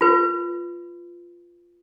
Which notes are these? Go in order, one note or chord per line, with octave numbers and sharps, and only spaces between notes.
F4 B4